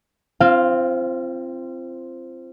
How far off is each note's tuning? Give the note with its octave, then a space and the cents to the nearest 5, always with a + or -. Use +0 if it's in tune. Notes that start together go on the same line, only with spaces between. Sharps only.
C4 +0 F4 -35 F5 +5